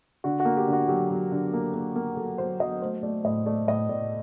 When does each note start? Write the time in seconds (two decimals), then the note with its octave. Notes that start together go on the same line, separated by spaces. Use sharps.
0.24 D3 F#4
0.40 F#4
0.45 A#3
0.57 G4
0.67 D3
0.73 F#4
0.88 F#3 G4
1.11 F#3
1.32 D3
1.54 A#3
1.74 A#3
1.96 A#3
2.17 F#3 A4
2.38 F#3 C5
2.60 F#3 D#5
2.81 A3 C5
3.03 A3 D5
3.25 A2 D#5
3.46 A3 D5
3.68 A2 D#5
3.89 A2 D5